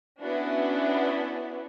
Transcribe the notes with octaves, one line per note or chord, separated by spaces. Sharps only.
B3 C#4 D4 E4 F#4 B4